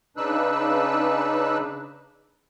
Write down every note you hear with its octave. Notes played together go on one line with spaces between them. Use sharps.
C#3 D4 D#4 B4 E6 F#6